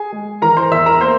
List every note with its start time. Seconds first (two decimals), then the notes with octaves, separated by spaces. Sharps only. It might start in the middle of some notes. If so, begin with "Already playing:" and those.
Already playing: G#4 G#5
0.12 G#3
0.42 E3 A#4 A#5
0.57 C5 C6
0.71 E2 E5 E6
0.86 A#4 A#5
1.01 A#3 C5 C6